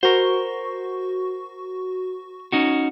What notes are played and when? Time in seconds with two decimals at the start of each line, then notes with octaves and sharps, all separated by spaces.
0.03 F#4 A#4 C5 C#6
2.52 C#4 D#4 F#4